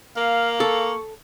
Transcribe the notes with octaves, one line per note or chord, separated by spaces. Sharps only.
A#3 F5
A4 C#6